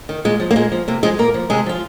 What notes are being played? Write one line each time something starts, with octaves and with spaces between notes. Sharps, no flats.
D#3
A#2 G#3
F3
A#3
A#2 G#3
F3
C3 A#3
F3 G#3 G#4
A#2 A#3 A#4
F3
C3 G#3 G#4
F3 F4